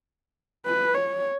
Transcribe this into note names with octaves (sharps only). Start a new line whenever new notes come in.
B4
C#5